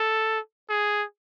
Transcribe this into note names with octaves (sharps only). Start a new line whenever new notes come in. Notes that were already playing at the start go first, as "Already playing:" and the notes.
Already playing: A4
G#4